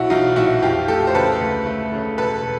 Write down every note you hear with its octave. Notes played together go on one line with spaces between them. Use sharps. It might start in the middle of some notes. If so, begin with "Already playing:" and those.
Already playing: B1 E4 F#4
B1 D#4 F4
A#2 E4 F#4
F2 F4 G4
A3 G4 A4
C5
C#3 A4 B4
D2
A3
C#3
E1 A4 B4